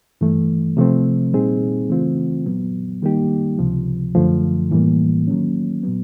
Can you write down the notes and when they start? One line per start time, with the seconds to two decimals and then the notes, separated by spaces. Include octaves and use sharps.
0.21 G2 E3 A3
0.77 C3 F3 A3 C4
1.33 A#2 G3 C4 D#4 G#4
1.89 C#3 E3 A3 C4 F4
2.46 A#2 F#3 B3
3.02 D#3 G3 A#3 D#4 G4
3.59 C#2 C3 F3
4.15 F#2 D3 F3 A3
4.71 A2 E3 G3 A#3
5.27 D#3 F#3 A#3 C#4
5.83 A#2 F#3 B3